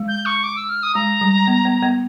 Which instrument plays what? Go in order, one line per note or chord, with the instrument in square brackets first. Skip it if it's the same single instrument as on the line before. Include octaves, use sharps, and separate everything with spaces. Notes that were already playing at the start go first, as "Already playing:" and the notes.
Already playing: [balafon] G#3
[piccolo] G6
C#6
D6
E6
F6
D#6
[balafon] G#3 [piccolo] A#5
[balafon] G3
B3
B3
B3